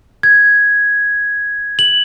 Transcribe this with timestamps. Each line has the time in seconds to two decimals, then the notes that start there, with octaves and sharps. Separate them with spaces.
0.23 G#6
1.79 F#7